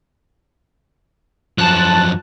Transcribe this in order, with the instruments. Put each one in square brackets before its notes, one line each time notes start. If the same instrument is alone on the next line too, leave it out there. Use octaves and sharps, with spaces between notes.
[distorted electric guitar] F#2 F3 [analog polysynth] A5 F#6